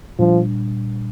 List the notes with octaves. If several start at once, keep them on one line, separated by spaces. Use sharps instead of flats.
A#2 F3 G3 D4